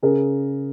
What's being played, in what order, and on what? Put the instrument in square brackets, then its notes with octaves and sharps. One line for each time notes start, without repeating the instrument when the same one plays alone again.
[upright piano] C#3 G#4 A#4